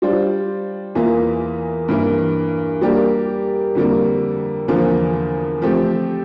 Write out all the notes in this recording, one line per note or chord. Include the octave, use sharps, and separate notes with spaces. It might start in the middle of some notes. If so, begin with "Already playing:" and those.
G3 D4 F4 C5
E2 E3 A#3 F4
G2 E3 A#3
G3 A#3 D4 G4
F2 D3 G3 A#3
E2 D3 F3 A#3 F4
F3 A3 C4 G4